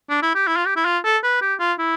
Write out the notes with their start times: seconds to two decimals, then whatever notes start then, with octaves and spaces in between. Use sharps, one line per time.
0.09 D4
0.23 E4
0.35 G4
0.47 E4
0.57 F4
0.66 G4
0.76 E4
0.85 F4
1.04 A4
1.23 B4
1.41 G4
1.60 F4
1.79 E4